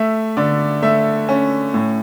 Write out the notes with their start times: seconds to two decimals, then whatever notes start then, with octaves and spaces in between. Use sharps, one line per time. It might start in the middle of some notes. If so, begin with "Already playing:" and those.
Already playing: A3 E5
0.37 D3 D5
0.82 A3 E5
1.29 C#4
1.74 A2